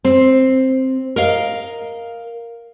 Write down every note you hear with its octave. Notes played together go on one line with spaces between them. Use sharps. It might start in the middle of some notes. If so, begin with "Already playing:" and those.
C4
A#4 D#5 F5